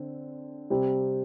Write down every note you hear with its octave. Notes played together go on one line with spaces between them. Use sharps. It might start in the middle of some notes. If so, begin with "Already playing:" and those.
Already playing: D3 C4
C3 G3 C4